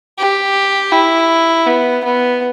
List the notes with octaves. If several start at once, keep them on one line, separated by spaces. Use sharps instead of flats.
G4
E4
B3
B3